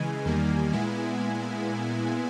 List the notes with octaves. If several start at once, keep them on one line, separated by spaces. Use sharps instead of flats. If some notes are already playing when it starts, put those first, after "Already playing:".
Already playing: C#3 E3 G#3 G#5
E2 D#3 G3 A#3
A#2 G#3 B3 E4